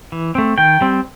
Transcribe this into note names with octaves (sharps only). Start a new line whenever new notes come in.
E3
A3 C4
D#3 G5
G3 C4